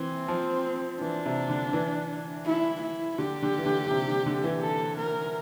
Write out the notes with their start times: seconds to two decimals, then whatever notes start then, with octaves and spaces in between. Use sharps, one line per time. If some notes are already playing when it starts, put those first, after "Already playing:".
Already playing: E3 C4
0.28 F3
1.01 E3 D4
1.26 C3
1.50 D3
1.73 E3
2.46 E4
2.82 E4
3.18 D3 G4
3.43 D3
3.58 E3
3.66 D3
3.86 D3
3.91 C3
4.08 D3
4.26 D3
4.44 E3
4.63 A4
4.99 A#4